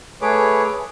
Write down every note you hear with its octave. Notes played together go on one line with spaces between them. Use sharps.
A3 G#4 B4 C#5 D6